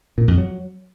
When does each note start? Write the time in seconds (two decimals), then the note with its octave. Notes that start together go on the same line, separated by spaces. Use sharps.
0.18 A#2
0.28 F2
0.38 F#3